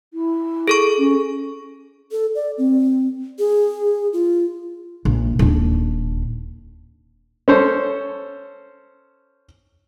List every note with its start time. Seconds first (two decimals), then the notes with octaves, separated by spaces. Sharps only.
0.14 E4
0.68 G#4 A4 C#6
0.98 C#4
2.12 A4
2.35 D5
2.58 C4
3.39 G#4
4.13 F4
5.05 A#1
5.39 D#1 D4
7.48 C#4 A4 C5